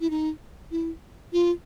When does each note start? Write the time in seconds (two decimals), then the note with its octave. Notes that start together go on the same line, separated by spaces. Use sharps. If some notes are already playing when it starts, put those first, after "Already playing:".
0.01 E4
0.10 D#4
0.71 E4
1.33 F4